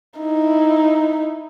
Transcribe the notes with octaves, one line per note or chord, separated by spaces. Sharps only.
D#4 E4